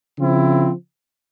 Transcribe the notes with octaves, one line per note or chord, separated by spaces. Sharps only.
C#3 F3 C4 E4